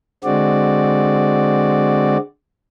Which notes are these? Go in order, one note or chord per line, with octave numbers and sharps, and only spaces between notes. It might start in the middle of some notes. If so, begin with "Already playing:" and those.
D3 G#3 C4 F#4 D5